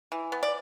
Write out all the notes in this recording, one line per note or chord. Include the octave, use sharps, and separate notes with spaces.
E3
B3
D5